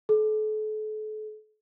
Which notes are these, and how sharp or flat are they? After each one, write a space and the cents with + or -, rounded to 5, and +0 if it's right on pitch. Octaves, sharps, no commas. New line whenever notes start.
A4 -40